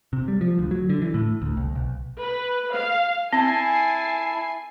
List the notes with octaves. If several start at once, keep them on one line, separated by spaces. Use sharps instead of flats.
C3
G3
F3
D2
F#3
D3
E3
A2
D2
C2
B1
B4
F5
C4 E4 G#5 A5 C7